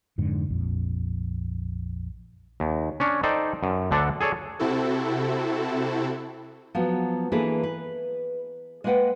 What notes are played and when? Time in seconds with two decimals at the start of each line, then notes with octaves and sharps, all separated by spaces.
0.18 F2 G#2 D3
0.48 A#1 F2
2.60 D#2
3.00 C#4 D4 C#5
3.23 D#4 A4 C5 D5 G5
3.63 F#2
3.91 D2 D3 D4 A4 F#5 A5
4.21 G#4 A4 C#5 D5
4.59 C3 C4 E4 F#4 A4
6.75 F3 F#3 B3
7.32 E3 A#3 D4 G#4 A4 B4
7.63 B4
8.84 G#3 A#3 B3 B4 F#5 G5